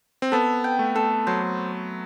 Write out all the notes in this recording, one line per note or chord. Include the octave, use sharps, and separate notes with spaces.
C4
B3 A4
G5
A3
A4
F#3 C5